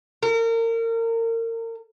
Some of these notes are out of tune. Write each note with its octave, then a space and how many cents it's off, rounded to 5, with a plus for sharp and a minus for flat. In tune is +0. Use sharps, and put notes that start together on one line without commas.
A#4 -30